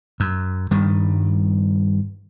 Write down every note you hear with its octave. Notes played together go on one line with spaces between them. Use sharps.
F#2
G2 D#3 G3